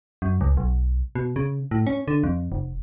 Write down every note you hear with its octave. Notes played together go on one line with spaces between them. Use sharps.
F#2
C#2
B1
B2
C#3
A2
C#4
D3
F2
F1